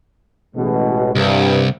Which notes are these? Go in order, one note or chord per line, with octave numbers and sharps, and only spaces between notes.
A1 B2 G#3
C2 G2